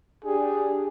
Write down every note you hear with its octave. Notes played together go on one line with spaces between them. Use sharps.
D4 G4 G#4